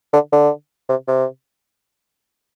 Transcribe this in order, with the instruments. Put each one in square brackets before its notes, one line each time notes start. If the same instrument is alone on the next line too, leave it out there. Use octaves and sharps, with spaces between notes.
[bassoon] D3
D3
C3
C3